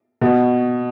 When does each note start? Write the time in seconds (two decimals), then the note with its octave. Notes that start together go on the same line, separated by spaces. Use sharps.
0.21 B2